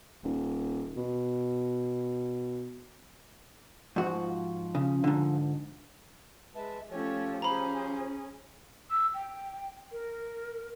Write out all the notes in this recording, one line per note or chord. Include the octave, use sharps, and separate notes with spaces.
D#1
B2
G#2 F3 F#4
C#3
G#2 D3
G#3 B4 E5 A5
F3 A3 C#4 G4 C#5
C#4 G#4 C5 A#5 B5
E6
G5
A#4